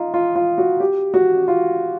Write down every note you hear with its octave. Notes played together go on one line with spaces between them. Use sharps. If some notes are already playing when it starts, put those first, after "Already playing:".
Already playing: D#4 F4
F4
F4
F#4
G4
F#4
F4